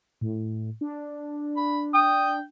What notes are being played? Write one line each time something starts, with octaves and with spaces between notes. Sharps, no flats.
A2
D4
B5
G5 D#6